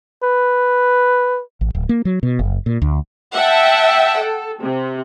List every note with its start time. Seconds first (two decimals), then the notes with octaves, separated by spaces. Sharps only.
0.23 B4
1.61 A1
1.75 D1
1.89 A#3
2.05 F#3
2.23 B2
2.39 F#1
2.66 A#2
2.82 D2
3.36 E5 F#5 G5 A5
4.19 A4
4.61 C3